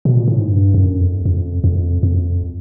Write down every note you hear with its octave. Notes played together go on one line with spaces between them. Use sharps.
B2
A#2
A2
G#2
G2
F#2
F2
F2
F2
F2